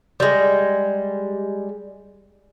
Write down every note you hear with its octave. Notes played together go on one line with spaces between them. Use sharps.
G3 G#3